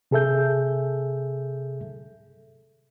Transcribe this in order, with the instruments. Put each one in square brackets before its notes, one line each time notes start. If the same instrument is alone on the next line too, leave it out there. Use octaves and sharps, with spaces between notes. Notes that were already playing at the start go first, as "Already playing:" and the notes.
[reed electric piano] C3 G#4 A4 E5 G6